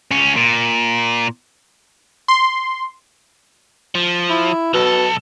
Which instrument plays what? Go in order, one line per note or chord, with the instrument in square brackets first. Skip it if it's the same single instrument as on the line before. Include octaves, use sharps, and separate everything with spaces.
[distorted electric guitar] C#2 C#4
A#2
[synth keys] C6
[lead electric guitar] F3
[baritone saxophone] E4
[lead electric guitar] B1 A4 [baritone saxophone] B2